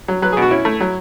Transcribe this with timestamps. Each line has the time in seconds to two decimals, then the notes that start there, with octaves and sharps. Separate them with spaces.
0.08 F#3
0.22 F#3 B4
0.32 G#4
0.37 B2
0.42 F#4
0.51 C#4 E4
0.65 A3
0.81 F#3